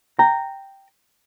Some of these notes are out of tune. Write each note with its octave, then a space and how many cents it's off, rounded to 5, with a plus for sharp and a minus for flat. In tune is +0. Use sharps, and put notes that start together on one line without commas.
G5 +0 A#5 -15